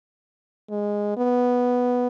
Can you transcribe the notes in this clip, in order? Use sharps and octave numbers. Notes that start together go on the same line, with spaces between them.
G#3
B3